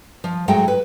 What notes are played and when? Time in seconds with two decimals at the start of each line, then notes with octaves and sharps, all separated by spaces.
0.24 F3
0.48 G#2 F#3 G#3 A3 G5
0.68 B4